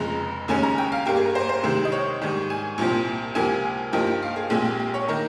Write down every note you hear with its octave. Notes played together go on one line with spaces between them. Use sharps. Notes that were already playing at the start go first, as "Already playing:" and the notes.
Already playing: F1 F2 C#3 G#3 A#5
D#2 C#3 G#3 C#4 G#5
A#5
G5
F5
G2 G3 A#3 G4
G#4
A#4
C5
C5
C2 C3 D#3 G#3
D#5
C#5
G#2 D#3 G3
G#5
C2 A#2 F3 C4
C#2 C3 F3 A#3 G#5
G2 F3 A#3 D#4 G5
G5
F5
G#4
A#1 A#2 G#3 C4 G#4
G4
G4
C#5
D#3 A#3 D#4 A#4